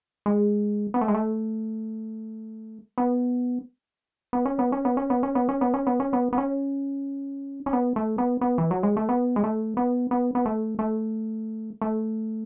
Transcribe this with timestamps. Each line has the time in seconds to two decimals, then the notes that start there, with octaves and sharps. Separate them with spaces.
0.26 G#3
0.94 B3
1.01 A3
1.08 G#3
1.15 A3
2.98 B3
4.33 B3
4.46 C#4
4.59 B3
4.72 C#4
4.85 B3
4.97 C#4
5.10 B3
5.23 C#4
5.35 B3
5.49 C#4
5.61 B3
5.74 C#4
5.87 B3
6.00 C#4
6.13 B3
6.33 B3
6.38 C#4
7.66 C#4
7.73 B3
7.96 A3
8.18 B3
8.41 B3
8.58 E3
8.71 F#3
8.83 G#3
8.97 A3
9.09 B3
9.36 G#3
9.44 A3
9.77 B3
10.11 B3
10.35 B3
10.46 A3
10.79 A3
11.82 A3